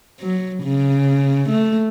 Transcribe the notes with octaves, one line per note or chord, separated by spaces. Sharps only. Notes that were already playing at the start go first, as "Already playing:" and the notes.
F#3
C#3
A3